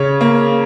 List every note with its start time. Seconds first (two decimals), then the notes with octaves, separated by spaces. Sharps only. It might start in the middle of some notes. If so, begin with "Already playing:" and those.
Already playing: C#3 C#5
0.21 A#3